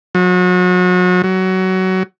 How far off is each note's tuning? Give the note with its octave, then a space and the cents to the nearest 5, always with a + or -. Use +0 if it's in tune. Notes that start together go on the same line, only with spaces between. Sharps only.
F#3 -35
F#3 +20